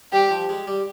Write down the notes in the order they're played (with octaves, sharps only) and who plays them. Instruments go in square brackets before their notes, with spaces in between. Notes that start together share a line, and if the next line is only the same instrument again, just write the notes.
[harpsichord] G3 [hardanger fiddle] G4
[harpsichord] F3
G#3
G3